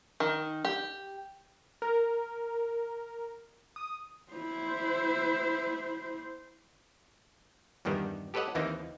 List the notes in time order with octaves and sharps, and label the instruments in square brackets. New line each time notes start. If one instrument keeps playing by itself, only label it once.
[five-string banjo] D#3
G4
[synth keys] A#4
D#6
[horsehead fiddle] E4 C5
[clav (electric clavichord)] E2 G2 D#3 G3 B3
G4 A4 B4 C#5 D#5 F#5
D#2 E3 A#3 C4 D#4